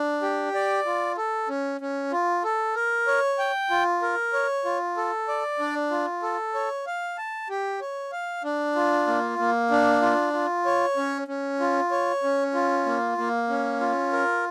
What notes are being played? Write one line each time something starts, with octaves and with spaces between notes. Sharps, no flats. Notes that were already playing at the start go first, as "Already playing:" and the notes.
Already playing: D4
G4
D5
F4
A4
C#4
C#4
F4
A4
A#4
C#5
G5
F4
A#4
C#5
F4
A4
D5
D4
F4
A4
C#5
F5
A5
G4
C#5
F5
D4
F4
A#3
A#3
D4
F4
F4
C#5
C#4
C#4
F4
C#5
C#4
F4
A#3
A#3
C#4
F4
A#4